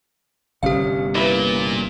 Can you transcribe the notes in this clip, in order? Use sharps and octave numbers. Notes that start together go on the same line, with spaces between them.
G1 C3 C#4 G4 F5
A#2 E4 B4